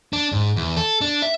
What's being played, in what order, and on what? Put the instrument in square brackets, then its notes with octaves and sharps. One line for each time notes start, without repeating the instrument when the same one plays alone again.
[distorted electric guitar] D4
G#2
E2
A4
D4
E5